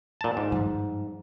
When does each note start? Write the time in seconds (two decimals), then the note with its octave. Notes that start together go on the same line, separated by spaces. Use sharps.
0.21 A#2 A5
0.37 G#2
0.52 G2 F3 G3